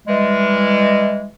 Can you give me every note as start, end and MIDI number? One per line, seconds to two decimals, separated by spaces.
0.07 1.29 52
0.07 1.29 55
0.07 1.29 56